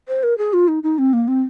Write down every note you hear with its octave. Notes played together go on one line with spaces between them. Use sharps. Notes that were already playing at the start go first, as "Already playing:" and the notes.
C5
A#4
G#4
F4
D#4
D#4
C4
A#3
C4